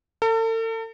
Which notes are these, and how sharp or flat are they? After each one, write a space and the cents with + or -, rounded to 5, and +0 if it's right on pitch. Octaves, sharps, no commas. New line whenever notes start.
A4 +40